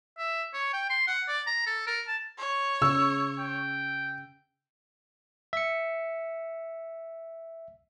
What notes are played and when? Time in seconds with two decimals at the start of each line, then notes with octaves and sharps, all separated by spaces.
0.18 E5
0.54 C#5
0.74 G5
0.90 C6
1.08 F#5
1.28 D5
1.47 A#5
1.67 A4
1.87 A#4
2.08 A5
2.39 C#5
2.82 C#3 E6
3.39 G5
5.53 E5 C#7